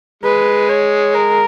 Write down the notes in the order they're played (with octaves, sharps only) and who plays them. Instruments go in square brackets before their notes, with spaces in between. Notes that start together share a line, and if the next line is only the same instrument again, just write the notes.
[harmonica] G#3 [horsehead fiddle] B4
[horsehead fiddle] C#5
A#4